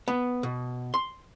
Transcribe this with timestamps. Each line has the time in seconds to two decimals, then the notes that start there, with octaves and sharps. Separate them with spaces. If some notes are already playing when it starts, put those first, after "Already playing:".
0.08 B3
0.43 B2
0.94 C6